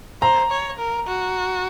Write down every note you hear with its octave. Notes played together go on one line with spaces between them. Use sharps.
C5 A#5
C#5
A#4
F#4